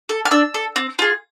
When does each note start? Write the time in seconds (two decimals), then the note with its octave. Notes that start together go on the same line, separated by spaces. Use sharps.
0.09 A4
0.25 F6
0.31 D4 E6
0.54 A4
0.76 C4
0.99 F4 G#4